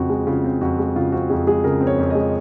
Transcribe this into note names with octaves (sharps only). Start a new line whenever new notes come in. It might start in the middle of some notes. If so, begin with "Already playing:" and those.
Already playing: F2 C#3 C4 F#4
G#3
C#3 F4
C4
F2 F#4
G#3
C#3 F4
C4 F#4
F2 G#4
G#3 G#4
C#3 A#4
C4
C#5
F2
G#3 D#5